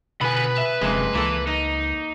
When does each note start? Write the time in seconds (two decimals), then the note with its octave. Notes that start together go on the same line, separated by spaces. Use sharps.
0.21 B2 D3 B3 B4 G#5 B5
0.58 E5
0.81 E1 F#2 C3 G#3 A#3
1.15 C#2 E3 A#3 A4
1.47 D#4 D#5